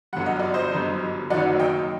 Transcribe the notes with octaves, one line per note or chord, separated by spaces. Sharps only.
G1 F#2 D3 G3 F#5
D#5
D5
C5 D#5
G1 F#2 D3 G3
F#1 F#2 D#3 F#3 D5 F#5
D#5 G5